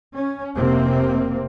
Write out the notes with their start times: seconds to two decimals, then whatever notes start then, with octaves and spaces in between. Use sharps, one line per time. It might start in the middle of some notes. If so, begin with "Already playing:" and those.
0.14 C#4
0.56 F1 C3 A#3 C4